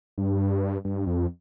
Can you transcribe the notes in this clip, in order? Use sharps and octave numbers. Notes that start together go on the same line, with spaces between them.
G2
G2
F2